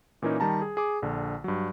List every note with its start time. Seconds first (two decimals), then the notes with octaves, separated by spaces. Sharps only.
0.22 A#2 E3 A#3 C#4 D#4
0.40 D#3 G3 A5 A#5
0.62 G#4
0.77 G#4 D6
1.02 A#1 D3
1.44 G2 F#3